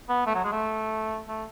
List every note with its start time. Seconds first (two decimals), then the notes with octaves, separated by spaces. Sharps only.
0.09 B3
0.26 A3
0.35 F#3
0.44 G#3
0.52 A3
1.28 A3